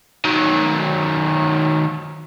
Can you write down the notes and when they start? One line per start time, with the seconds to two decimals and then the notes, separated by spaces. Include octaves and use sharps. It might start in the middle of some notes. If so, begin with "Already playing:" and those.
0.25 D#3 F#3